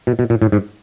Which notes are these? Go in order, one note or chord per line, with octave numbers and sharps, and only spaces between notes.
B2
B2
A#2
A2
G#2